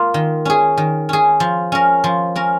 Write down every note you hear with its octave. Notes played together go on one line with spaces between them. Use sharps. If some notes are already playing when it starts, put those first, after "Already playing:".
Already playing: A#3 F4
D#3
C#4 G#4
D#3
C#4 G#4
F3
C#4 A#4
F3
C#4 A#4